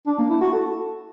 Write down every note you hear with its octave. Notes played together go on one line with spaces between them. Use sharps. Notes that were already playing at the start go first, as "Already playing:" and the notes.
D4
A#3
E4
F#4
A4